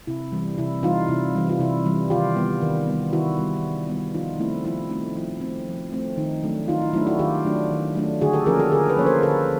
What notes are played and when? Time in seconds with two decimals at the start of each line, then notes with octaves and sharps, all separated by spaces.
0.07 C3 E4
0.32 E3 G3
0.58 C3 E4
0.83 E3 G3 D#4 F4
1.08 C3 E4
1.35 E3 G3
1.49 F4
1.59 C3 E4
1.85 E3 G3
2.10 D#3 F4 G4
2.36 G3 B3
2.62 D#3
2.87 G3 B3
3.13 D#3 E4 F#4
3.38 G3 B3
3.63 D#3
3.89 G3 B3
4.14 F3 D#4 F4
4.39 A3 C4 E4
4.65 F3 E4
4.91 A3 C4 D#4
5.16 F3 E4
5.41 A3 C4
5.67 F3
5.92 A3 C4
6.17 D#3 D#4
6.43 F#3 A3 D4
6.68 D#3 D#4 F4
6.82 E4
6.93 F#3 A3 D4 E4
7.07 E4 F#4
7.19 D#3 F4 G4
7.45 F#3 A3 D4
7.71 D#3
7.95 F#3 A3 D4
8.21 D3 F#4 G#4
8.33 G4 A4
8.46 F3 A#3 C#4 G#4 A#4
8.60 G4 A4
8.72 D3 G#4 A#4
8.89 A4 B4
8.97 F3 A#3 C#4 C#5
9.06 A#4 C5
9.23 D3 A4 B4